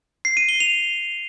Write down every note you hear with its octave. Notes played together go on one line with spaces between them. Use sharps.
C7
D#7
G7
F7